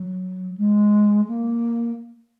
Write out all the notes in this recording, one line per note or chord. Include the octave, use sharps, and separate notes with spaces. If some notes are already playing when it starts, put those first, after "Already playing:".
Already playing: F#3
G#3
A#3